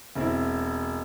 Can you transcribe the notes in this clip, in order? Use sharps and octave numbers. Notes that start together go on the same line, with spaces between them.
E1 C4 E4